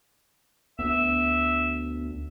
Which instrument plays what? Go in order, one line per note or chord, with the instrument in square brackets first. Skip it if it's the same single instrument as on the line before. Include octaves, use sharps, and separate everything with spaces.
[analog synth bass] D2 [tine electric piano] B3 [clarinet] E5